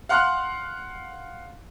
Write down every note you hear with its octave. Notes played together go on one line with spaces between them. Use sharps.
F5 F#5 C6 F6 F#6